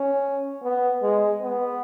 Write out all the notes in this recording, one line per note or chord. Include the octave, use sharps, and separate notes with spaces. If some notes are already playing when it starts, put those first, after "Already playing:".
Already playing: C#4
B3
G#3
B3